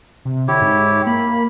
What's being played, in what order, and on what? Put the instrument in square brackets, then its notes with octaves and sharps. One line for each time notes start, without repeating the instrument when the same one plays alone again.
[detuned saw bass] C3
[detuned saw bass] D3 [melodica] E4 G4 C#5
[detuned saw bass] G#2
[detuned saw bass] A#3 [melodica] B5